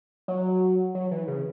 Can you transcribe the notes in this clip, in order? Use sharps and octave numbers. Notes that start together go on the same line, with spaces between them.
F#3
F#3
E3
C#3